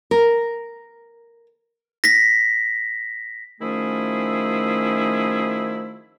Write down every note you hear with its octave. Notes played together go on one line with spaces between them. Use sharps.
A#4
A#6 B6
D#3 F3 A3 C#4 E4 G#4